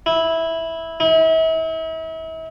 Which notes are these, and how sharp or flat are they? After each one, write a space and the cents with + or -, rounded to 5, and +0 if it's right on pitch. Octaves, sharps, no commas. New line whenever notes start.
E4 -10
E4 -40